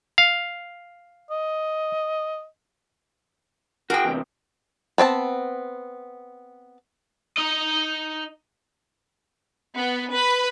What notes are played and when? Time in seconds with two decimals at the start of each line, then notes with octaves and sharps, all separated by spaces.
0.18 F5
1.31 D#5
3.90 F#4 G#4 A#4 G5
4.05 E2 C3
4.98 B3 C4 D5 A5
7.37 D#4 D#5
9.77 B3
10.13 B4